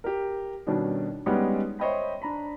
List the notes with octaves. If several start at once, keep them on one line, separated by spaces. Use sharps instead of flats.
G4 A#4
B2 D#3 G3 C#4 D4
G3 G#3 B3 C#4 D#4 G4
C5 C#5 D#5 E5 G5 B5
D4 A#5 B5